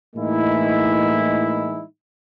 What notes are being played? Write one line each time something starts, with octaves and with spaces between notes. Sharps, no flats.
A2 E3 G#3 A#3 D#4 E4